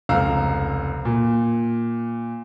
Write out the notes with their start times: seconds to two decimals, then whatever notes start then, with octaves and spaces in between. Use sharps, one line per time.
0.09 F1 C#2 C4 F5 A#5 E6
1.05 A#2